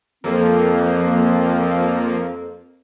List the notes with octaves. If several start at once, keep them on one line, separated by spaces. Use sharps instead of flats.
F2 F3 A#3 C4